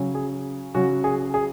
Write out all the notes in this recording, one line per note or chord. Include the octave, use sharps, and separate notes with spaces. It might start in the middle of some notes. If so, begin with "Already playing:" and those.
Already playing: C#3 F#3 C#4
G#4
C#3 F#3 C#4 F#4
G#4
G#4